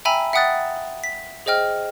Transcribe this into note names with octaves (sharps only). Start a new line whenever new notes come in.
E5 G5 G#5 A#5 B5 E6
E5 F#5 G5 D#6 F#6 A6
B6
G#4 C5 D#5 G5 F6